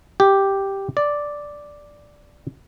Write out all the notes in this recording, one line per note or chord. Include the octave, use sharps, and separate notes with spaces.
G4
D5